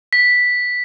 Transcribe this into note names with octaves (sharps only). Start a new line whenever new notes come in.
B6